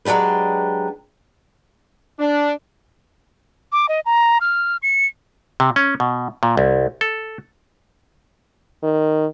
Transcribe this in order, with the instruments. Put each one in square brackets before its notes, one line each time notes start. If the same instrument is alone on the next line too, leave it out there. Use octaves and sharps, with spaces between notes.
[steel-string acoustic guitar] F#3 G#3 D4 G4 B4
[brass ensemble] D4
[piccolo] D6
D#5
A#5
F6
C#7
[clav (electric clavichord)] C3
C#4
B2
A#2
C2
A4
[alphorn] D#3